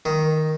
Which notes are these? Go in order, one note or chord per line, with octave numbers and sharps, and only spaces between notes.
D#3